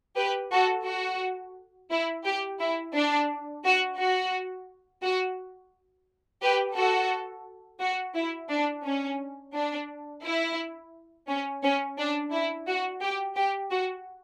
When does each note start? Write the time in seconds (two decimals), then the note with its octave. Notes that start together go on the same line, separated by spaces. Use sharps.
0.17 G4 B4
0.52 F#4 A4
0.87 F#4
1.91 E4
2.25 G4
2.60 E4
2.95 D4
3.65 F#4
3.99 F#4
5.03 F#4
6.43 G4 B4
6.76 F#4 A4
7.81 F#4
8.16 E4
8.51 D4
8.85 C#4
9.54 D4
10.24 E4
11.28 C#4
11.63 C#4
11.98 D4
12.33 E4
12.68 F#4
13.02 G4
13.36 G4
13.71 F#4